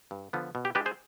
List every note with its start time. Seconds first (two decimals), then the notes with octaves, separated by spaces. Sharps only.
0.11 G2
0.33 D3 F3 B3
0.55 B2
0.65 G4
0.75 G#3 D4 G4 B4
0.86 G#4 C5